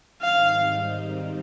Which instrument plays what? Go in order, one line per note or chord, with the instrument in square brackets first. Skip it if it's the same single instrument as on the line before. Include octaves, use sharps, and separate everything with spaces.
[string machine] G#2 D#3 G3 C4 D#4 [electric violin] F5